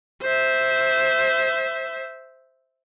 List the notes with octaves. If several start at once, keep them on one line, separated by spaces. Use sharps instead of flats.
C5 E5